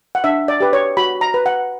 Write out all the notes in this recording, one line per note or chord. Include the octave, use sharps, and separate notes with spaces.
F#5
D4 E5
D5
G4 B4
C#5
F#4 B5
A#5
B4
F#5